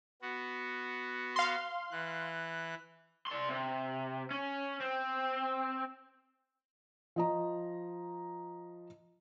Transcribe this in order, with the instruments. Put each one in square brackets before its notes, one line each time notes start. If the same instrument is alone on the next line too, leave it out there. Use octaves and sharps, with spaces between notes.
[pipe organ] B3 F#4
[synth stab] F5 C6
[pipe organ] E3 F#6
[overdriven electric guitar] D5 C6
C3
C#4
C4
[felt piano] F3 D#5 A#5